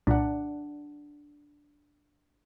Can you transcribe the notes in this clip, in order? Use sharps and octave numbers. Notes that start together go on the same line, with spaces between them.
C2 A#2 D4 F#5